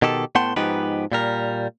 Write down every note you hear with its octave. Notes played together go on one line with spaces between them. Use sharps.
B2 D#3 G4 A4
A2 B3 F#5 G5 A5 C6
G#2 F3 B3 D#4 G4 B4
A#2 G3 A#4